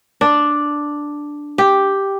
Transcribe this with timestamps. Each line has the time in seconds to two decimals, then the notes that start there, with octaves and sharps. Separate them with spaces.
0.21 D4
1.58 G4